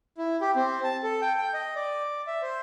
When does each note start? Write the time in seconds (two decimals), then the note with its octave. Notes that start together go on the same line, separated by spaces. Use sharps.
0.18 E4
0.41 G4
0.56 C4
0.84 A5
1.03 A4
1.21 G5
1.38 G5
1.54 D#5
1.75 D5
2.27 E5
2.42 C5